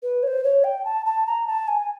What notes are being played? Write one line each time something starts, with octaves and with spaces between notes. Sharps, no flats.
B4
C#5
C5
C#5
G5
A5
A5
A#5
A5
G#5